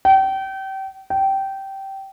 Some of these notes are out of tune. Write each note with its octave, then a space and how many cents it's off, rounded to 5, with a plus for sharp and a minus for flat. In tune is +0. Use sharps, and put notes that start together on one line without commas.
G5 -30
G5 -15